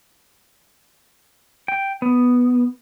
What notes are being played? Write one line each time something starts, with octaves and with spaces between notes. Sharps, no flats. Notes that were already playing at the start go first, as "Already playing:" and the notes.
G5
B3